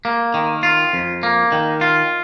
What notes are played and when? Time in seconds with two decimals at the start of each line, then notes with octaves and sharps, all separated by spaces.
0.05 A#3
0.34 D#3
0.63 F4
0.93 F2
1.23 A#3
1.52 D#3
1.81 F4